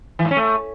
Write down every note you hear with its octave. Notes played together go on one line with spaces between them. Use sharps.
E3
G#2
C#4
A3